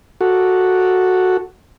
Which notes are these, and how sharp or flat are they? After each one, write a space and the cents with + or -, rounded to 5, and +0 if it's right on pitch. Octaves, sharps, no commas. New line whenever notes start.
F#4 +0 A4 +0